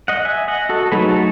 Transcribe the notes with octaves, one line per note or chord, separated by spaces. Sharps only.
D#5 F#5
E5 G#5
D#5 F#5
F#4 A4
A4
F#3 A3 D#4 G#4 B4
F#4 A4